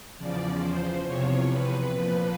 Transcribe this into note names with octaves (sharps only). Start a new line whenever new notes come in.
E2 C#3 F3 D5
C5
E2 C3 F3 C#5
B4
A#2 F3